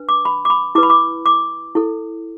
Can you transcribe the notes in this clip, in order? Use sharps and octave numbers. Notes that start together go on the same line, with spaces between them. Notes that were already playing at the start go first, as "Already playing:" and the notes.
Already playing: D4 B4
D6
B5
D6
B5
E4 B4 D6
B5
D6
D6
E4 A4